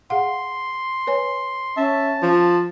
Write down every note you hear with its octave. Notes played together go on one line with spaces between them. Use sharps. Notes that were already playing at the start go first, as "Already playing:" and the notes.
G#4 F5 F#5 C6
B4 C#5 G#5
C#4 E5 A5
F3